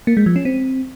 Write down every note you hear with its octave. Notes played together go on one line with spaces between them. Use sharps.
A#3
G#3
F3
C#4
C4